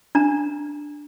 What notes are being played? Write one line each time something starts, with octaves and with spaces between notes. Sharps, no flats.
D4 A#5